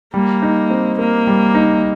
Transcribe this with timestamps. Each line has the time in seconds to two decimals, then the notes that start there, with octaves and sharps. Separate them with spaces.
0.14 G3 A#3
0.42 D#4
0.70 C4
0.99 A#3 A#4
1.27 G3
1.55 D#4